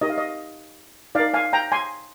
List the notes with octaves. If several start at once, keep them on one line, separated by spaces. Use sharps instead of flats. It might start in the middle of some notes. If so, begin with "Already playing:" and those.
D#4 G4 A#4 D#5
F5
D#5
D#4 A#4 D5 F5
F5 G#5
G5 A#5
G#5 C6